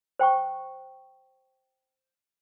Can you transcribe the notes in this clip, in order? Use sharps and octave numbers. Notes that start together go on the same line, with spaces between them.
C5 G5 C#6